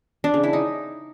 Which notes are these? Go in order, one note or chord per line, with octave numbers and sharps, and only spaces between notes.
D4
C#3
E4
D#4